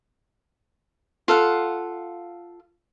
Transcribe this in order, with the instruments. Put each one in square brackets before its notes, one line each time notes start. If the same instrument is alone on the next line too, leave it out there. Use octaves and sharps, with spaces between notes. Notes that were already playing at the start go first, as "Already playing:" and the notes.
[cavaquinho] F4 A4 F5 F#5